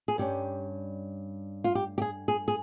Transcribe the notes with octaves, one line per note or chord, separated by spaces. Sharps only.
G#4
G2 G3 C#4 G4
F4
G4
G4
G#4
G#4
G#4